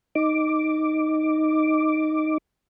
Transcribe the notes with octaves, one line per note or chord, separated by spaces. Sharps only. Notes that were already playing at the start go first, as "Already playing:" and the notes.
D#4 D6